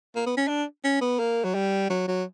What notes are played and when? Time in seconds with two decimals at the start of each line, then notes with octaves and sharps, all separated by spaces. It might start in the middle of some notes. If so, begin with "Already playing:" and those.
0.15 A#3
0.26 B3
0.37 C#4
0.48 D4
0.84 C#4
1.01 B3
1.19 A#3
1.44 F#3
1.54 G3
1.90 F#3
2.08 F#3